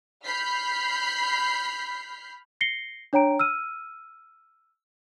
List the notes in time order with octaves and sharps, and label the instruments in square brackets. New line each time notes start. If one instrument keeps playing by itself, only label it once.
[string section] B5 F6 G6 B6 C7
[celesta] A#6 C7 C#7 G7
D4 C#5 G5 A#5 D7
E6 F6 D#7